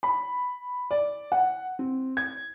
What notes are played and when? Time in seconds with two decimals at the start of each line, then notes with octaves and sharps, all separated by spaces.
0.03 B5
0.91 D5
1.32 F#5
1.79 C4
2.17 G#6